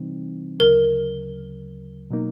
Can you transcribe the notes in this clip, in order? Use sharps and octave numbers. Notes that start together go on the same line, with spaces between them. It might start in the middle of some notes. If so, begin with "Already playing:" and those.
Already playing: C3 E3 G3 C4 D#4
D2 C#3 F#3 A#4
B2 F#3 A#3 D#4